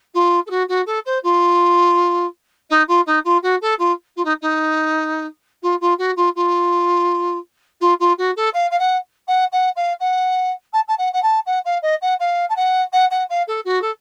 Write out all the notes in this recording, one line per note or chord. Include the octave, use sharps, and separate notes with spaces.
F4
A4
F#4
F#4
A4
C5
F4
D#4
F4
D#4
F4
F#4
A4
F4
F4
D#4
D#4
F4
F4
F#4
F4
F4
F4
F4
F#4
A4
F5
F5
F#5
F#5
F#5
F5
F#5
A5
A5
F#5
F#5
A5
F#5
F5
D#5
F#5
F5
A5
F#5
F#5
F#5
F5
A4
F#4
A4